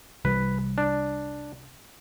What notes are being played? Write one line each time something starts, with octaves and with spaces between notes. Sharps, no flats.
C2 E3 G3 B4
D4